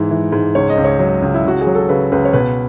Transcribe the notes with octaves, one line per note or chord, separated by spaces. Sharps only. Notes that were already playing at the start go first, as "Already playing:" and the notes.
Already playing: G#2 E3
E3
G#2
C#2 C#5
D#5
C#2
C#5
F#3
C#2
E4
C#2 F#4
G#4
F#3
A4
C#3 B4
C#2 B4
C#5
B2 B4